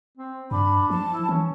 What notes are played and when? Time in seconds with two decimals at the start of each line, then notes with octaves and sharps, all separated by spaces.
0.17 C4
0.51 G2 D4 B5
0.90 F3 A5
1.14 E4
1.29 E3 C#4